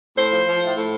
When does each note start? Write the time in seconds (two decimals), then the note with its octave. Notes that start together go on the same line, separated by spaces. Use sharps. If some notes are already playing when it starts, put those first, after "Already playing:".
0.18 A2 C5
0.32 F3
0.48 F3
0.63 A2
0.77 A2